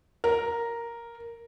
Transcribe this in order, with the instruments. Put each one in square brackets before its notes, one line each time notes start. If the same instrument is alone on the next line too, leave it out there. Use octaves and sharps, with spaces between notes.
[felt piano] A#4